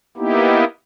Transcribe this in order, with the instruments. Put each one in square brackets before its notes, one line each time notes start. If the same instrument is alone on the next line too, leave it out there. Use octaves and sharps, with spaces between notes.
[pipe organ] A#3 B3 D#4 E4 G4